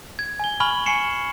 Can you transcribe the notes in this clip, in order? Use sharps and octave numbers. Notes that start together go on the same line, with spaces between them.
G#6
G#5 G7
G#5 B5 C#6 F6 F#7 G7
G#5 C#6 C7 C#7 E7